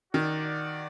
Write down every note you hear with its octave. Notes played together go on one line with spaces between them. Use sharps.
D#3 F#4 D5 F#5